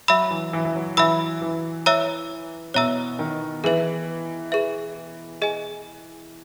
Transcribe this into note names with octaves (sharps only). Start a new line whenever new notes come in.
F#3 E5 B5 E6
E3
E3
E3
F#3
E3 E5 B5 E6
E3
C#5 E5 A#5 E6
B2 C#5 E5 A#5 E6
D#3
E3 G#4 B4 E5
G#4 B4 E5
G#4 D#5 G#5